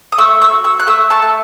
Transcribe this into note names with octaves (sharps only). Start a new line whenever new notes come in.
D#6
A3 C#6 E6
C#6 E6
F#4
C#6 E6
F#6
A3 C#6 E6
A5 C#6
A3